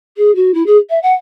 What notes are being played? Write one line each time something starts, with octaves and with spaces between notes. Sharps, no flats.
G#4
F#4
E4
G#4
E5
F#5